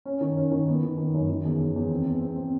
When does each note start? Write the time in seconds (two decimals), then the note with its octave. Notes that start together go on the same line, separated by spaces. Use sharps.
0.05 C#4
0.21 D#3
0.37 C#4
0.52 D#3
0.68 B3
0.84 D#3
0.98 D#3
1.14 F#2
1.30 D#3
1.45 E2
1.60 E2
1.76 E2
1.91 C4
2.06 E2
2.21 C4
2.36 C4